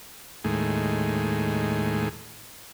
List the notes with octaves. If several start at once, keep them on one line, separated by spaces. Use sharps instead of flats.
D#2 A2 G#3